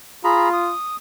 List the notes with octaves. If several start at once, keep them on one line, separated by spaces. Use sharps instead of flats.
F4 G#4 A#5 B5
D#6